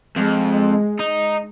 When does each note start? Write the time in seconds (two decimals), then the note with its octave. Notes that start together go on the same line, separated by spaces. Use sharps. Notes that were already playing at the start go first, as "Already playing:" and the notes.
0.17 F2 G#3
0.99 D#4